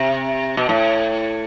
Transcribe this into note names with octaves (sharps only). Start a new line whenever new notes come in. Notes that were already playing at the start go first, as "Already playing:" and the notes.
Already playing: C3
B2
A2